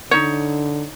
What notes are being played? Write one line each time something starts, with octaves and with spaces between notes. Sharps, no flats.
D3 D#4 C#5